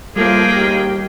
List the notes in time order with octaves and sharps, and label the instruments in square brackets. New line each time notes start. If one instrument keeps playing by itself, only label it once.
[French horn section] A2 F3 [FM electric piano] G3 [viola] A#3 G5 [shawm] G#4
[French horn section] D#2 G4